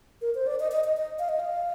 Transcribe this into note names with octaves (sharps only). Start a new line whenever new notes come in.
A#4
C5
D5
D#5
D#5
D#5
D#5
F5
D#5
F5